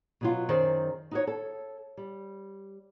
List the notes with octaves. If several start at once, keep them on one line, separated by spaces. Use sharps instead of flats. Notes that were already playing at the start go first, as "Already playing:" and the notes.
B2 F#3 F4
F#2 D#3 G#4 C5 D5
D#4 F#4 C#5
A4
G3